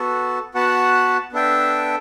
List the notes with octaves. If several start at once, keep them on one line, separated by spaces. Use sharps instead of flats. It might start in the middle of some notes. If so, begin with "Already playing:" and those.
Already playing: B3 F#4 A4
B3 F#4 B4 F#5 A5
B3 D4 A4 E5 G5